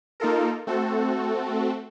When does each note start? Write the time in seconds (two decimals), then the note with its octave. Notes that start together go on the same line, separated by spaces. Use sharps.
0.20 A#3 D#4 F4 A4 A#4
0.67 A3 C4 F#4 A4